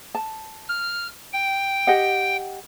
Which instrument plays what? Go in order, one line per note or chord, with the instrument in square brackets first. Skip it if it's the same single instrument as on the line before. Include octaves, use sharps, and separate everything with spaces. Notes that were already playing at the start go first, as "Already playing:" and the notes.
[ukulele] A5
[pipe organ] F6
G5
[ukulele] G4 D#5 F#5